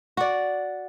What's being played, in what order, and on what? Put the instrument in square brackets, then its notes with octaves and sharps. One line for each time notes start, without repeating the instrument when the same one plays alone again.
[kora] F#4 D5